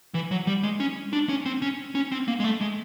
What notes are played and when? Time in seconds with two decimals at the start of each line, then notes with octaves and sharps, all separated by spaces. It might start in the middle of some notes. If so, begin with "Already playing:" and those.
0.14 E3
0.31 F#3
0.47 G3
0.63 G#3
0.80 C#4
1.13 D4
1.29 C#4
1.46 C4
1.62 C#4
1.95 C#4
2.12 C4
2.28 A#3
2.40 G#3
2.44 A3
2.61 G#3